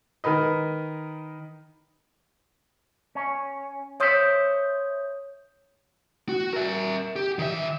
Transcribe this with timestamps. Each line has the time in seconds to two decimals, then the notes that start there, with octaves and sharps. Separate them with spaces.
0.24 D#3 A#4 B4 D#5
3.15 C#4
4.00 C5 C#5 E5 D#6 G6
6.29 F#4
6.53 A#4 E5
7.16 G4
7.39 D#3 E5